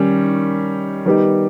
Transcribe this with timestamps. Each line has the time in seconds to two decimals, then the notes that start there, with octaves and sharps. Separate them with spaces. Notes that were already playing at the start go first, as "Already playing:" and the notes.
Already playing: D#3 G3 C#4
1.05 D#3 G3 B3 D#4 G4